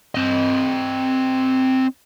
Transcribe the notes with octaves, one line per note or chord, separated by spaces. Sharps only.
C4 D#5